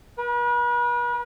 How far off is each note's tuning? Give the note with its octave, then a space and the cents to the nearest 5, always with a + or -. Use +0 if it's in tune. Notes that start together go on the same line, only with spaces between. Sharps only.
B4 -40